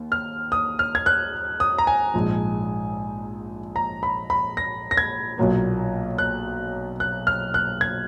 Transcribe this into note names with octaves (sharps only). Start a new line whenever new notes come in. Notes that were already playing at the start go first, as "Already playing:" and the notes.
Already playing: D#2
F6
D#6
F6
G#6
F#6
D#6
A#5
G#5
A#1 G#2 F3
A#5
B5
B5
A#6
A#6
G#6
B1 A#2 F#3 A#3
F#6
F#6
F6
F#6
G#6